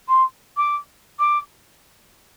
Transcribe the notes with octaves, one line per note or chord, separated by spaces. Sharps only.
C6
D6
D6